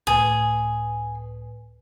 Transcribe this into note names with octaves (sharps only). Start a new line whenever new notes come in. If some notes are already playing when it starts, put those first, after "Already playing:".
C#2 A2 G#4 B4